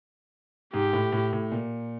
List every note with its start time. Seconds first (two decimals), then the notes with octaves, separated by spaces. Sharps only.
0.73 G#2 G4
0.93 A2
1.13 A2
1.33 A2
1.52 A#2